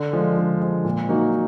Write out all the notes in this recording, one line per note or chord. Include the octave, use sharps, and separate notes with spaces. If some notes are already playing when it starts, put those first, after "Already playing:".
Already playing: D3
F3 G#3
D3
F3 G#3
A#2
F#3 A#3 D#4 F#4